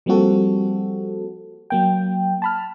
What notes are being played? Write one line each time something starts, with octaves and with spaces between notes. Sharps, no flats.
F3 G3 A#3 C4 F#4 A4
F#3 A#3 G5
A5 B5 F6